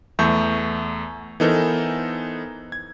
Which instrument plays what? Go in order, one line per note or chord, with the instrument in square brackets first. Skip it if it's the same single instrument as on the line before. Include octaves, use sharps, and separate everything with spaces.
[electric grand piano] E2 A3 E5 A5 C#6 G6
E3 B3 D#4 A4 A#4 C5
G#6